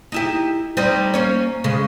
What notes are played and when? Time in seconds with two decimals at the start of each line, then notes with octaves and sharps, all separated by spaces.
0.12 D#4 E4 G4
0.77 G3 C4 D#4
1.14 A#3 C#4 C#5
1.64 C#3 G#3